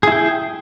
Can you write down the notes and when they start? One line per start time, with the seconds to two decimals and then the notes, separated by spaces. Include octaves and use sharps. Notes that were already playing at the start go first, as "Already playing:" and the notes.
0.03 G#4
0.07 E4
0.12 G5